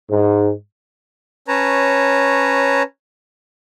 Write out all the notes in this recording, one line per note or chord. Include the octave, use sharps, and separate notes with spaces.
G#2
C#4 B4 C#5 A5 A#5